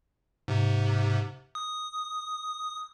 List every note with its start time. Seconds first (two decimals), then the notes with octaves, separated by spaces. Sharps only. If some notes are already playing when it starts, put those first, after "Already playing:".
0.48 G#2 C3
1.55 D#6